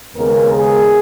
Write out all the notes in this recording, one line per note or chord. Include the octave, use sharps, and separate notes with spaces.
D#2 C#3 G#3 B3 A#4
G#4